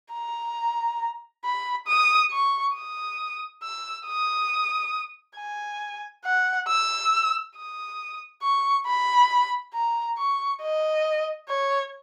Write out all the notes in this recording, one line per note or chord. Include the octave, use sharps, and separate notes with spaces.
A#5
B5
D#6
C#6
D#6
E6
D#6
G#5
F#5
E6
D#6
C#6
B5
A#5
C#6
D#5
C#5